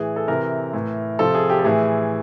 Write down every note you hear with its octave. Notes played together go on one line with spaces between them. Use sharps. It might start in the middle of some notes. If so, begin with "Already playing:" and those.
Already playing: A2 E3 G#4
A4
C3 E3 A#4
A2 E3
C3 F3 A4
G#4
G4
A4
A2 E3 G#4